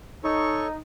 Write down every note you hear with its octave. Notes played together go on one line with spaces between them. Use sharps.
D#4 A4 C#5 C#6